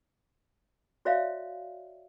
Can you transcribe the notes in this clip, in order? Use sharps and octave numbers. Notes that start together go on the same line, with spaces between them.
F#4 C#5 D5 E5 F5